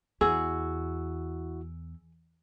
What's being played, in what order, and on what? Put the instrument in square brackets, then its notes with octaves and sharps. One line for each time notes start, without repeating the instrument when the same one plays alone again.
[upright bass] E2 [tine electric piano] E4 F#4 [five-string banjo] G#4 [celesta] E6